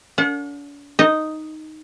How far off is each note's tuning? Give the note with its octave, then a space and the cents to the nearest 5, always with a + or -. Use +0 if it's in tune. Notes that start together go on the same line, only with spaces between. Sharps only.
D4 -45 F#5 -40
D#4 +0 D#5 +0